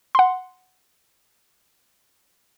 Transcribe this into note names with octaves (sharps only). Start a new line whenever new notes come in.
F#5 C6